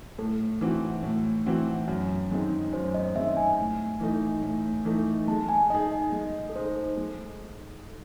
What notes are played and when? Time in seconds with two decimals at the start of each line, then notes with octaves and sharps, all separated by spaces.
0.18 A2 A4
0.61 E3 C4 F#4
1.03 A2
1.46 E3 C4 F#4
1.88 F#2
2.31 D#3 G#3 C4 D#4
2.73 F#2 C5
2.94 D#5
3.15 D#3 G#3 C4 D#4 E5
3.37 G#5
3.58 A2
4.00 E3 A3 D#4
4.43 A2
4.85 E3 A3 D#4
5.28 G#3 A5
5.49 G#5
5.70 D#4 G#4 D#5
5.92 D#5
6.12 G#3
6.49 A4
6.55 D#4 G#4 C5
6.76 A4
6.97 G#3